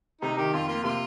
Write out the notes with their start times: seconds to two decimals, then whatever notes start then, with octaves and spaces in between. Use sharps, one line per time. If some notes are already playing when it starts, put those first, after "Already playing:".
0.21 C3 D#4
0.37 D#3 G4
0.53 F2 F4
0.68 A#3 F4
0.84 C3 F4